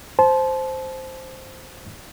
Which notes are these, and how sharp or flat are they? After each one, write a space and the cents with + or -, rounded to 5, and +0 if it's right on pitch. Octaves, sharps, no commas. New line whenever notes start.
C5 +0 A5 -30